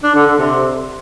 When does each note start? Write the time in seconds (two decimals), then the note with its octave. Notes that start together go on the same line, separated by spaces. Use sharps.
0.03 D4
0.15 D3
0.27 D3
0.38 C3